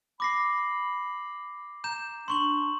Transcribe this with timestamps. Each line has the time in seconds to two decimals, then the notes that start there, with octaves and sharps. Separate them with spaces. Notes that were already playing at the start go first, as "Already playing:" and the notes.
0.20 B5 D6 A#6 C7
1.84 A#5 G6 E7
2.28 D4 C6 C#6 F#7